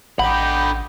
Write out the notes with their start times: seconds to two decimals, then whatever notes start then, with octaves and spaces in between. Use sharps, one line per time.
0.19 A1 D3 D#4 G4 F#5 B5